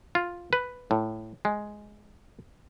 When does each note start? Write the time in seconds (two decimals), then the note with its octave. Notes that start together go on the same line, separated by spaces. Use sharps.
0.15 F4
0.53 B4
0.91 A2
1.45 G#3